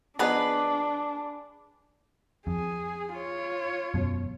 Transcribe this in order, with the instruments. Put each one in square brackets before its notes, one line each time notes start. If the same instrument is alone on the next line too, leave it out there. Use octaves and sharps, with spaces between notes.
[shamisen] F3 B3 D#4 [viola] D4 [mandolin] G#4 B4
[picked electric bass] F2 [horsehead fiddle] G#4
[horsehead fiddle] F4 C#5
[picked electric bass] E1 F#2 B2